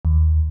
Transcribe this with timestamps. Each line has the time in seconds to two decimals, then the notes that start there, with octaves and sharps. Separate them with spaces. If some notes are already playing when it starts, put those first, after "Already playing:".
0.05 D#2